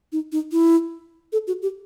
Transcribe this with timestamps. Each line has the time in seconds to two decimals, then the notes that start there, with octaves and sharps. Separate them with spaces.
0.12 D#4
0.32 D#4
0.52 E4
1.32 A4
1.47 F#4
1.62 G4